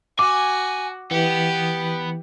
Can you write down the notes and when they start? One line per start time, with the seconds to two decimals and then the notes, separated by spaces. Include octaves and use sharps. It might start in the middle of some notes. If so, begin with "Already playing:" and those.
0.19 F#4 G#5 D6
1.11 E3 B3 G4